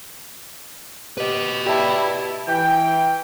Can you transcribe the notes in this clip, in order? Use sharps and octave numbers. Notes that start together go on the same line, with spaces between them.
G4 B4 D#5
E4 G4 D5 A5
E3 G5